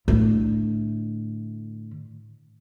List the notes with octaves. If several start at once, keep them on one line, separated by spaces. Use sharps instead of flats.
A2 D3